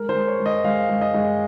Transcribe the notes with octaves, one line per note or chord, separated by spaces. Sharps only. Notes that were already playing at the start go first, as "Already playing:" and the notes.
Already playing: G#3 A#4
C5
G#3
C#5
G#3
D#5
G#3 F5
G#3
D#5
G#3